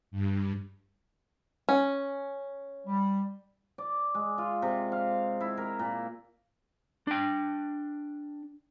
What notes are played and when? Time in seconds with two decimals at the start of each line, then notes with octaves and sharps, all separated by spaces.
0.11 G2
1.69 C#4
2.87 G3
3.78 D5
4.15 G#3
4.38 F4
4.62 C3
4.92 F5
5.41 E4
5.57 A#4
5.79 A#2
7.07 D4 G5